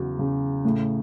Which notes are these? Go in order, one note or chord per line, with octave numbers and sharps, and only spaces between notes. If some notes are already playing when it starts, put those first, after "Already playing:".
Already playing: E2 C#3 F#3
C#3
A2